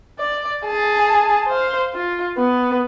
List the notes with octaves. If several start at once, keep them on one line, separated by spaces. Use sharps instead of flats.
D5
G#4 A5
C5 F5
F4
B3